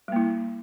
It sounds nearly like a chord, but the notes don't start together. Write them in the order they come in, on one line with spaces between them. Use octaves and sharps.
G3 A#3 E4